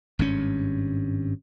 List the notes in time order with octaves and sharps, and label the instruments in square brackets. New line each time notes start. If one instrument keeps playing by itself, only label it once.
[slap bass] G#1 G2 C#4